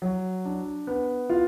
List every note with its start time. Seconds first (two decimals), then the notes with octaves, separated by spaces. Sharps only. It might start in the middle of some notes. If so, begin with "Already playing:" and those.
0.02 F#3
0.45 D4
0.87 B3
1.30 F4